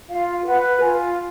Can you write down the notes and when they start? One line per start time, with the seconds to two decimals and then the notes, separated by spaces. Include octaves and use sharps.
0.08 F4 F5
0.45 B4 F#5
0.81 F4 G#5